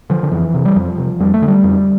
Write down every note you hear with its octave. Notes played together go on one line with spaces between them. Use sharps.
D3 F3
D3
F2 E3
C3
G3
F2 F3
C3
F2 G3
A3
D3
G3
F2